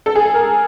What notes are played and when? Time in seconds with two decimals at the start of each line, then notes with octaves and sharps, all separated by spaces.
0.06 A4
0.15 G#4
0.25 A4
0.34 A#4